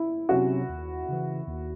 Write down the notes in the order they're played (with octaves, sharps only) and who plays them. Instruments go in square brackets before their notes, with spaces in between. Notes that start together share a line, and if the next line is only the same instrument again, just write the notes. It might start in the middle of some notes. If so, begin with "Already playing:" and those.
Already playing: [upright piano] E4
[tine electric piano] C3 F#3 C#4 [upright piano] F#4
[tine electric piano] D#2
C#3 E3
D#2